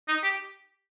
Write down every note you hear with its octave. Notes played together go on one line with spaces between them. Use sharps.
D#4
G4